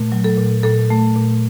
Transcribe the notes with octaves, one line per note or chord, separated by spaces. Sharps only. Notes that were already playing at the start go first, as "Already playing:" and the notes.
Already playing: A#2 A3
F#3
A4
A#2
A#2 A4
A3
A#2